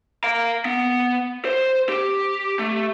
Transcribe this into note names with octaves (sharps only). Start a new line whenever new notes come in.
F5 A#5
B3
C5
G4
A3